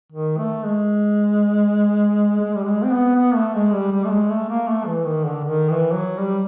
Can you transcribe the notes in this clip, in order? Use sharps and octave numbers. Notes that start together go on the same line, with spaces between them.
D#3
A3
G#3
G#3
G3
G#3
C4
B3
B3
A3
G#3
G3
G3
A3
G#3
A3
A#3
A3
E3
D#3
D3
D#3
E3
F#3
G3